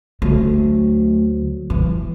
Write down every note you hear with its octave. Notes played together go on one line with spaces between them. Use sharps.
D2 F#3 A3
E3